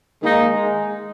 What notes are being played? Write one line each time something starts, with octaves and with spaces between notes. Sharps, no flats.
D#3 G#3 A#3 D#4